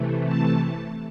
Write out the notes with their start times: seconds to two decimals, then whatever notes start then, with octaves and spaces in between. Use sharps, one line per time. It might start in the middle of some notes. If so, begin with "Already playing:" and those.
Already playing: C3 E3 A3
0.25 A5